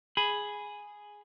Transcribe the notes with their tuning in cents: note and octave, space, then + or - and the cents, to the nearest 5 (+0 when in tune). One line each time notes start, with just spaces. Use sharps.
G#4 +0 B5 +0